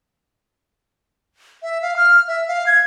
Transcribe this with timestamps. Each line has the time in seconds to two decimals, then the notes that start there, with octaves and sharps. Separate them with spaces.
1.62 E5
1.82 F5
1.96 F6
2.28 E5
2.48 F5
2.67 G#6